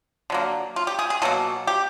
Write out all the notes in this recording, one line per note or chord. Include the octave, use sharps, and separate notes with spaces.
D3 F#3 A#3
F4
G4
G#4
G#4
B2 F#3 A#3 A4
G4